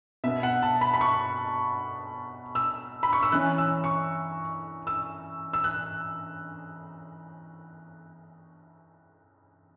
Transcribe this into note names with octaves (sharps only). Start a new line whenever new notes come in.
B2 B3 E5
F#5
A5
B5
B5
C#6
E6
B5
C#6
E6
E3 C#4 F#6
E6
C#6
E6
E6
F#6